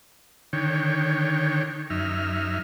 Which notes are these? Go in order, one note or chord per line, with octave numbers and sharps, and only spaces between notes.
D3 D#3 C#5 G5
F#2 D#4 E5 F6